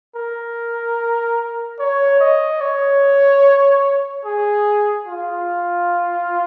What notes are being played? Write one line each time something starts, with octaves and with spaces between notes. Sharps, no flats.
A#4
C#5
D#5
C#5
G#4
F4